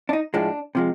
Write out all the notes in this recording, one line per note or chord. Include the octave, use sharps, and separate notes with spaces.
D4
D#4
A2 F3 G#3 D4
C3 F3 G#3